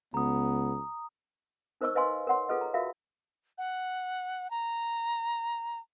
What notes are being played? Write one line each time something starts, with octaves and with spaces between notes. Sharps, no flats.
C#2 B3 A#5 D#6
D#4 A#4 C5 D#5 C#6 E6
B4 D#5 F5 G#5 C6
A#4 C#5 F#5 C6
F4 G#4 A4 B4 D#5
A#5
F4 F#4 A#4 E5 F5
F#5
A#5